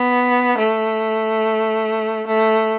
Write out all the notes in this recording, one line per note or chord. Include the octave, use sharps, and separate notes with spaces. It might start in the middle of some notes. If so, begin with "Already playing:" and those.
Already playing: B3
A3
A3